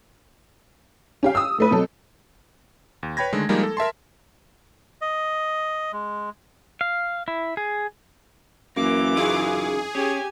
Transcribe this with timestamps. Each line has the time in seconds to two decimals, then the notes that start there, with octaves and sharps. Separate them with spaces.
1.23 C#4 G4 F5
1.35 D#6 E6
1.58 A2 A3 B4
1.71 B2 F#3 C4 A4
3.03 D#2
3.17 B4 C#5 G5 B5 G#6 A#6
3.33 D3 D#3 G#3 A3
3.49 F3 G3 G#3 A#3 D#4 A#4
3.63 A4
3.77 A#4 E5 A5 C6
5.01 D#5
5.93 G#3
6.81 F5
7.28 E4
7.57 G#4
8.77 F#2 E3 A#3 D6
9.17 C#3 D#4 F4 G#4
9.95 C#4 G4 G#5